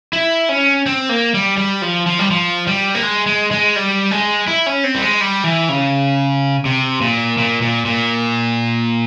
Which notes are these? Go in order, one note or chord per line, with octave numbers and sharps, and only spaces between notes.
E4
C#4
C4
A#3
G3
G3
F3
F3
G3
F3
G3
A#3
G#3
G#3
G#3
G3
G#3
E4
C#4
C4
G3
G#3
G3
E3
C#3
C3
A#2
A#2
A#2
A#2